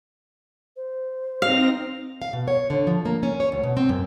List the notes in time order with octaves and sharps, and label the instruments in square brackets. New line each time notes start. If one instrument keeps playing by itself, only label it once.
[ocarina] C5
[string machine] C4 D#4 A#6 [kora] F5
[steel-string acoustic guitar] F5
B2
C#5
D3
F3
A#3
C#4
C#5
D2
B2
C4
F#2